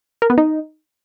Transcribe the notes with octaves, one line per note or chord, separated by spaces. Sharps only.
A#4
B3
D#4